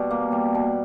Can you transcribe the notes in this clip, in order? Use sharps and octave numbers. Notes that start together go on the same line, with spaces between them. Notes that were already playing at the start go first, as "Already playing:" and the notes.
Already playing: B2 G3
A#3
G3
B2